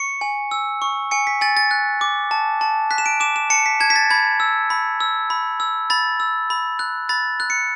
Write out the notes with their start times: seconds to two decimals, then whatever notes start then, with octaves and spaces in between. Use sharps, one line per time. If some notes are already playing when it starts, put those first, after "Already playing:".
Already playing: C#6 C#7
0.21 G#5
0.51 E6
0.82 C#6
1.11 G#5 C#7
1.27 B6
1.41 G#5 A6
1.57 A6
1.71 F#6
2.01 D6
2.31 A5
2.61 A5
2.91 F#6 B6
2.98 E7
3.06 D7
3.20 D6 E7
3.36 E7
3.50 A5 C#7
3.66 B6
3.80 A5 G#6
3.90 B6
3.96 A6
4.10 B5 G#6
4.40 E6
4.70 B5
5.00 E6
5.30 B5
5.60 E6
5.90 B5 A6
6.20 E6
6.50 B5
6.79 F#6
7.09 B5 A6
7.40 F#6
7.50 C#7